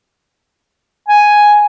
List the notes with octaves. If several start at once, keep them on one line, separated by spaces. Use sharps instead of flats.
G#5